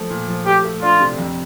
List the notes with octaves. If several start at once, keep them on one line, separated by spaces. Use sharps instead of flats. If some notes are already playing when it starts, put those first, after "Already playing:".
Already playing: F3 A3
A#2
F3
A3 G4
A3
D4 F4
C3
F2